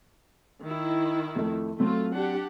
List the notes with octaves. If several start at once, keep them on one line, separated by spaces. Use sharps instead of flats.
D#3 E4
F2 A3
F#3 A3 C4 F4
D4 G4 F#5